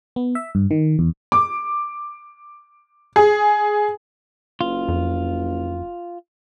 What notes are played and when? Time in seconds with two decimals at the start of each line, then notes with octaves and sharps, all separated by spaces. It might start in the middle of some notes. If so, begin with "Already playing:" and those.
0.16 B3
0.35 E5
0.55 G2
0.71 D#3
0.99 E2
1.32 D6
3.16 G#4
4.61 F#1 F4
4.88 F2